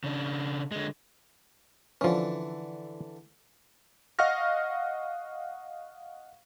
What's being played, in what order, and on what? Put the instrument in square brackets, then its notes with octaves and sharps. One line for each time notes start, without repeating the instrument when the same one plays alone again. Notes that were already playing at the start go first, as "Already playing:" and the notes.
[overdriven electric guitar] C#3 D4
D3 G#3
[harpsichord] D3 E3 [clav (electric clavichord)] F3 C#4
[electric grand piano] D#5 F5 F#5 C#6 F6 A#6